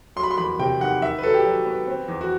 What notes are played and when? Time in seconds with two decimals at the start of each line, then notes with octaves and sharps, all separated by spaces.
0.16 F#3 C6
0.23 B5
0.31 C6
0.38 E2 B5
0.59 C3 G5
0.81 D#3 F#5
1.02 D#3 E5
1.18 B4
1.23 F#3 A4
1.34 G4
1.45 F#3
1.66 B3
1.87 C4
2.08 E2
2.21 F#4